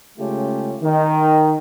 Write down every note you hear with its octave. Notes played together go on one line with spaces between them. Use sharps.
C#3 G#3 A3 C#4 F4 G4
D#3